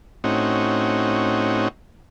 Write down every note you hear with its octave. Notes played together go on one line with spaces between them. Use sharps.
A2 C4 C#4 D#4 F#4